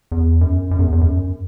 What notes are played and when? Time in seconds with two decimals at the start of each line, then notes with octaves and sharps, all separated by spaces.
0.12 E2
0.41 F#2
0.71 F#2
0.79 E2
0.92 E2
1.01 F#2